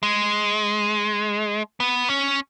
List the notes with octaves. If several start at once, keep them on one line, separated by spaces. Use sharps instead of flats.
G#3
B3
C#4